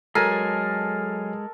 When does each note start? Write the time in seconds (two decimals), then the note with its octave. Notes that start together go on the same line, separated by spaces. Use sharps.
0.15 F#3 G#3 A4 A#4 G#5 C7